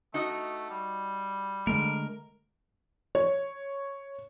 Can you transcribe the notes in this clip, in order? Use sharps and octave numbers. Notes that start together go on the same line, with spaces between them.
A3 D#4 F#4 D#5
G3
D3 G#3 A3 A#4
C#5